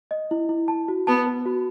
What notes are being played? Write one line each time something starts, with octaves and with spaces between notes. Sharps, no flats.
D#5
E4
E4
A5
F#4
B3 A5
B4
F#4